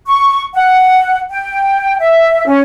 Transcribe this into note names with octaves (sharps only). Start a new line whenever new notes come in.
C#6
F#5
G5
E5
C#4